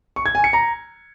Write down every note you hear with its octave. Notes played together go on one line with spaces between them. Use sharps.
C#6
G#6
G#5
C#7
A#5